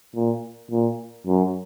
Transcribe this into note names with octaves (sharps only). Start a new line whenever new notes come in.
A#2
A#2
F#2